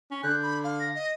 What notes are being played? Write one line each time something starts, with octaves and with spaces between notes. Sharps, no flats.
C#4
D3 F#6 G6
B5
F5
A#6
D#5